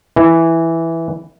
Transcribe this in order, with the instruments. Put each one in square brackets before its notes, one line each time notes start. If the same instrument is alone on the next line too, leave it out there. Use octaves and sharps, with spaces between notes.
[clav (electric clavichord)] E3